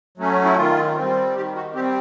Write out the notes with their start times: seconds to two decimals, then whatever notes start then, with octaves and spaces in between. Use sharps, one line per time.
0.18 F#3 A3 C#4
0.45 E4
0.57 D#3 F4
0.96 C4
1.01 G3
1.35 D#3 G4
1.56 F#4
1.74 G3 C4 G4